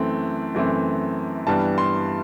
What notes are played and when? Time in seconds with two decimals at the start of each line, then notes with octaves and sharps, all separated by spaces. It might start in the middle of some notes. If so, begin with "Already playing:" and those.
Already playing: F#2 E3 A3 C4
0.55 F#2 E3 A3 C4
1.47 G2 E3 G3 B3 D4 A5
1.78 C6